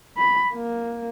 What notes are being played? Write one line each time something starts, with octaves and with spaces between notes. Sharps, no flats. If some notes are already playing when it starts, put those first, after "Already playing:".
B5
A#3